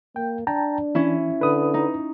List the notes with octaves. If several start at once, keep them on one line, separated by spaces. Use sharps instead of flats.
A#3 G5
D4 G5 A5 A#5
E3 C#4 E4
D3 B4 D#6
D#4